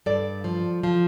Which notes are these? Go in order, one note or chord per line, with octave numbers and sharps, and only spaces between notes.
G2 A4 D5
F3
F3